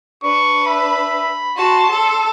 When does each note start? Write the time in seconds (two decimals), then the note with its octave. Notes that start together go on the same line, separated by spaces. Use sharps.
0.23 D4 B4 C#6
0.67 E5 B5
1.57 F#4 A5 C6
1.91 A4